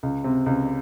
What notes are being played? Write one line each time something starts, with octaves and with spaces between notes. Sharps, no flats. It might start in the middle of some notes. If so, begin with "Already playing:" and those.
C#2
C3
C#2